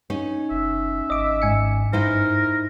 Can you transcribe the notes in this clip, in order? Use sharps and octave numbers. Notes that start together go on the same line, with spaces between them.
C#4 D#4 C#5
F#1 E5
G#1 D#5 D6
G#2 G#5 C#7
G2 D#4 E4 A#4 C5